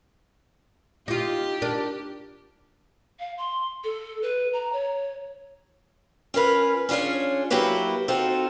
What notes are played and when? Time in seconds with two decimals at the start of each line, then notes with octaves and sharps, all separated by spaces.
1.08 D#4 F4 G4
1.62 D4 A#4
3.19 F5
3.37 C6
3.84 A4
4.22 B4
4.53 A#5
4.72 C#5
6.34 C#4 F4 A#4 B4
6.89 C#4 D4 F4 G#4 C#5
7.50 F#3 A#3 E4 F#4 G4 B4
8.08 C4 D#4 F4 F#4 A4 C5